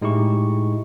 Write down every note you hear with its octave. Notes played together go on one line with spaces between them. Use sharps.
A2 G#3 D#4 E4 G4 C#6